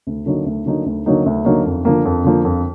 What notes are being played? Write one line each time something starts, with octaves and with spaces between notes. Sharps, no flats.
D2
D3 F#3 A#3 D#4
D2
D3 F#3 A#3 D#4
D2
D3 F#3 A#3 D#4
D2
D3 F#3 A#3 D#4
F2
D3 F3 A#3
F2
D3 F3 A#3
F2